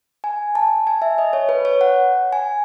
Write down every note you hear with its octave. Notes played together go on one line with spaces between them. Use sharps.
G#5
A5
G#5
E5
D#5
C#5
B4
C#5
F#5
G#5